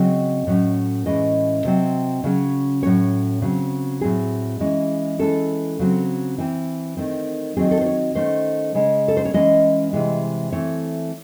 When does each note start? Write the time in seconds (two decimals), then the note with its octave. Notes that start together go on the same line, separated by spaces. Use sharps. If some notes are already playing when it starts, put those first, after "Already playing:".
Already playing: C#3 F#3 C4 D#5
0.47 A2 F#3 A3 C#4
1.06 A2 E3 G#3 C#4 D#5
1.65 C3 F#3 C4
2.24 C#3 F#3 C#4
2.82 A2 F#3 C#4 C#5
3.42 C#3 F#3 C4
4.01 A2 F#3 C4 G#4
4.60 E3 G#3 C#4
5.19 E3 G#3 C#4 A4
5.79 C#3 F#3 C4
6.38 E3 C4
6.97 D#3 A3 C4
7.57 D#3 F#3 C4 G#4
7.71 A4
7.81 C5
7.86 C#5
8.15 D#3 A3 C#4 C5
8.75 C#3 G#3 C#4
9.08 A4
9.17 C5
9.25 C#5
9.33 E3 G#3 C#4 D#5
9.93 C3 E3 G#3
10.52 E3 A3 C4 C#5